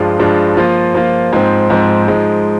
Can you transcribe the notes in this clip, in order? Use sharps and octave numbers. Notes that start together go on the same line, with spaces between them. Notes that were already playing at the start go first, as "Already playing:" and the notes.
Already playing: G2 F3 G#3 D4 F4
G2 F3 G#3 D4 F4
F3 A#3 F4
F3 A#3 F4
G#2 F3 C4
G#2 F3 C4
G#2 F3 G#3